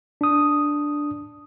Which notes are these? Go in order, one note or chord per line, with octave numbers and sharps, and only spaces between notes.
D4 D#6